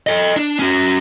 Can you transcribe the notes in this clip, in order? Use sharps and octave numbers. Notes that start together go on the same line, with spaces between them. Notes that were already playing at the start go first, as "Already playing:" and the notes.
A4 D#5
D4
C#4 F#4